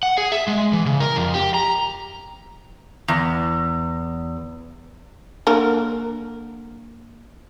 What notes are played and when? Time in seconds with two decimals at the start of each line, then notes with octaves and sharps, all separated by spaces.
0.03 F#5
0.18 G#4
0.32 E5
0.47 G#3
0.73 E3
0.86 C#3
1.00 A#4
1.16 F2
1.34 G4
1.54 A#5
3.08 E2
5.47 D3 A#3 A#4